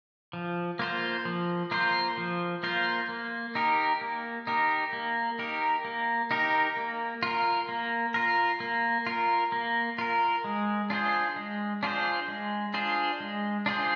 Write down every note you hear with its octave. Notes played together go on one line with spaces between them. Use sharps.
F3
A#3 F4 C5
F3
A#3 F4 C5
F3
A#3 F4 C5
A#3
D#4 G4 A#4
A#3
D#4 G4 A#4
A#3
D#4 G4 A#4
A#3
D#4 G4 A#4
A#3
F4 A#4
A#3
F4 A#4
A#3
F4 A#4
A#3
F4 A#4
G#3
D4 F4 G#4 C5
G#3
D4 F4 G#4 C5
G#3
D4 F4 G#4 C5
G#3
D4 F4 G#4 C5